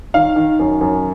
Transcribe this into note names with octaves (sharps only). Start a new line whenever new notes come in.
D#3 F5
D#3
F#2
F#2